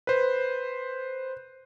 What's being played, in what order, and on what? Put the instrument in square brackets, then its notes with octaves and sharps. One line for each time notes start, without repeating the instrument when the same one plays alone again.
[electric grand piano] B4 C5